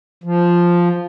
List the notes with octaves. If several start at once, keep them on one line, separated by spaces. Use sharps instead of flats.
F3